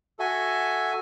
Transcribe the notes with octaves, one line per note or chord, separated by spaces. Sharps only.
F#4 A4 E5 G#5